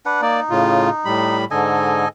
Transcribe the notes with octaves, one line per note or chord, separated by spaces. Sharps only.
D4 B4 F#5
A#3 D#4 D5
A2 C#3 F4
A2 G3 B5
G#2 D3 A4 D#5 G#5